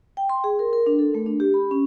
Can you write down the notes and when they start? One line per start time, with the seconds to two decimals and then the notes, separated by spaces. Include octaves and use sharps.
0.17 G5
0.29 C6
0.44 G#4
0.59 A#4
0.73 A#4
0.86 D4
0.99 A4
1.15 A3
1.26 D4
1.40 G4
1.54 B5
1.71 C#4